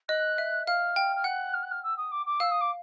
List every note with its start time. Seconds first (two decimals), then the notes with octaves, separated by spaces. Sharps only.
0.08 D#5 F#6
0.38 E5
0.67 F5 F6
0.96 G5
1.15 F6
1.24 F#5 F#6
1.53 F6
1.63 F#6
1.71 F6
1.83 E6
1.97 D#6
2.11 D6
2.26 D6
2.40 F5 E6
2.51 D#6
2.61 D6